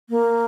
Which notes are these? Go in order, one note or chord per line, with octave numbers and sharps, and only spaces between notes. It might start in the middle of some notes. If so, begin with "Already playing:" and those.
A#3